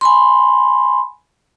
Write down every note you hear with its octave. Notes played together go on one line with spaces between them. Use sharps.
G#5 B5 C6